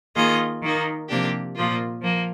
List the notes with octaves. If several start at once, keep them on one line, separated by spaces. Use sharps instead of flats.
D#3 A#3 F4 G#4 D#5
D#3 A#3 D#4
C3 F3 A#3 D4 G4
A#2 F3 A#3 F4
F3 A#3